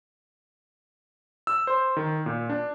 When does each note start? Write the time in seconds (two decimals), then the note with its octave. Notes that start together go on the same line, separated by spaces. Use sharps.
1.47 E6
1.67 C5
1.97 D#3
2.26 A#2
2.49 D4